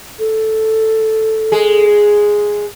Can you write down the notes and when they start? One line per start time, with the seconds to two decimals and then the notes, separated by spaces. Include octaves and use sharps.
0.19 A4
1.52 G#3 G#4